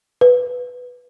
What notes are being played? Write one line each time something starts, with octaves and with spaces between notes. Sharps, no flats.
B4